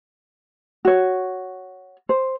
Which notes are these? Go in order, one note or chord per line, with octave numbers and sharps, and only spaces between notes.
F#4 C#5
C5